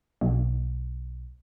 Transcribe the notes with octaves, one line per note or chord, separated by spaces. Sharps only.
B1